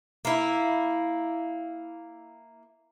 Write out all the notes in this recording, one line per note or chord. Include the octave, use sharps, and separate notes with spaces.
A#3 E4